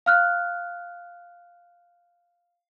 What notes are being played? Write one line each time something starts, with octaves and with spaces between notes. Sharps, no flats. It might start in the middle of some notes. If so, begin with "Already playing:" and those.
F5 F6 F#6